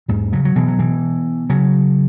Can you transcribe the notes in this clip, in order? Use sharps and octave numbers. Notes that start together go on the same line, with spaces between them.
E2 G#2
C#3 F#3
F#3
B2 E3
F#3
B2 E3
C#3 F#3